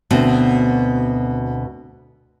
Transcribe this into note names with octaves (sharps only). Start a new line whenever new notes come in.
D2 B2 C4